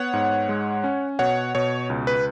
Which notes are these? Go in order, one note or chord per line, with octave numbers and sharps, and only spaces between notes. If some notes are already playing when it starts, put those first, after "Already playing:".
Already playing: B3 C#5 F#5
G#2
G#3
C#4
B2 C#5 F#5
B2 C#5
C#2
B4